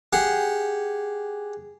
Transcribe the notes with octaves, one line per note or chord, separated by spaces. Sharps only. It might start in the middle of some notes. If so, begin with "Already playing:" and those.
G4 G#4 F#5